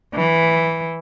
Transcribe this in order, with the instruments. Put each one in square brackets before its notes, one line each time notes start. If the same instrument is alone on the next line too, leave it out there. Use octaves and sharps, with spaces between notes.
[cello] E3